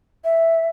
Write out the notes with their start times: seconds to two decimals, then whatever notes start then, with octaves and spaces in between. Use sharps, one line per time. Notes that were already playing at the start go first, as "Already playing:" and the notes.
0.24 E5